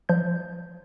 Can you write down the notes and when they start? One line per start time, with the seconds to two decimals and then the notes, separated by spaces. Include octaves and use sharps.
0.09 F3 G6